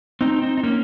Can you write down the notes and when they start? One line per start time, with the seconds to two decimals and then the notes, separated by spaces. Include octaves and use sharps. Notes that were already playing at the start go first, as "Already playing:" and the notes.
0.21 C4 D#4
0.42 C4 D#4
0.58 D#4
0.63 A#3 C#4